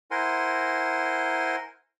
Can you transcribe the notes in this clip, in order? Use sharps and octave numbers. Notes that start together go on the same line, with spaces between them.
E4 A#4 C5 F#5 G#5 C6